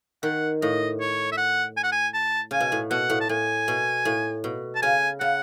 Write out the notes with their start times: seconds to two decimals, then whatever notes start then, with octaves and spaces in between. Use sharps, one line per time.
0.23 D#3 F#5
0.62 A2 D#5
1.00 C#5
1.32 E5
1.38 F#5
1.77 G#5
1.84 F#5
1.92 G#5
2.14 A5
2.51 C#3 G#5
2.60 B2
2.72 A2
2.91 B2 F#5
3.10 A2
3.21 A5
3.29 A2 G#5
3.68 B2
4.05 A2
4.44 B2
4.76 A5
4.82 C#3 G#5
5.20 C#3 F#5